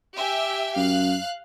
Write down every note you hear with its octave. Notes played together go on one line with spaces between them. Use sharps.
G4 E5 G#5
F#2 F5 F#6